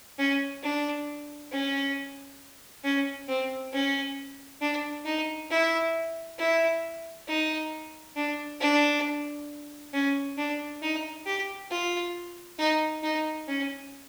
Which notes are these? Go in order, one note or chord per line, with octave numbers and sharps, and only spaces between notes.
C#4
D4
C#4
C#4
C4
C#4
D4
D#4
E4
E4
D#4
D4
D4
C#4
D4
D#4
G4
F4
D#4
D#4
C#4